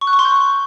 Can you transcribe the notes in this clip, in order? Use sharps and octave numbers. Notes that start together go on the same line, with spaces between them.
C#6
F#6
C#6
C6
G6